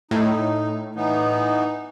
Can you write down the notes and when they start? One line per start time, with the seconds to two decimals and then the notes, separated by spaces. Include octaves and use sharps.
0.11 A2 D#4
0.96 E3 B3 D#4